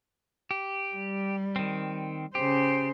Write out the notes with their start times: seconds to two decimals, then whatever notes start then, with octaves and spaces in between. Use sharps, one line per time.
0.51 G4
0.95 G3
1.56 D#3 C4
2.35 C#3 G4 C5